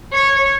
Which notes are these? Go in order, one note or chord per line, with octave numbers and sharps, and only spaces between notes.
C#5